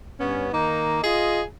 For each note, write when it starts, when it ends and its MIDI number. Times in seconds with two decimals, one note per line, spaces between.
0.20 0.48 43
0.20 0.48 59
0.20 0.48 61
0.53 0.99 51
0.53 0.99 58
0.53 0.99 63
1.02 1.41 65
1.02 1.41 68
1.02 1.41 75